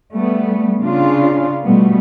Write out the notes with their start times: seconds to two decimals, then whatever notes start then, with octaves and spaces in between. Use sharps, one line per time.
0.13 G3 A3 B3
0.80 C#3 D4 F4
1.66 B2 G3 A3 B3